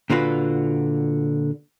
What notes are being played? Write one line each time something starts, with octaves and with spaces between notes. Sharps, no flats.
A#2 D3 F4 F#4 B4